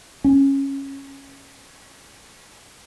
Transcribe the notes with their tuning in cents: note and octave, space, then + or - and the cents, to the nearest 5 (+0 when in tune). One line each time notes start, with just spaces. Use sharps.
C#4 -10